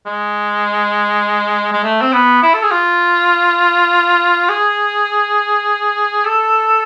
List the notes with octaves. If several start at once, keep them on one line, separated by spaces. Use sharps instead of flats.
G#3
G#3
A3
C4
B3
E4
A4
G#4
F4
G#4
A4